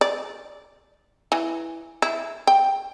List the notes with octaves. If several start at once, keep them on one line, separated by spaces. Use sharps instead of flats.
D5
E3
E4
G5